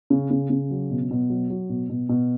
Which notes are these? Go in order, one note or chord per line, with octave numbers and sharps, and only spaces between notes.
C#3
C#3
C#3
F#3
B2
B2
F#3
F#3
B2
B2
B2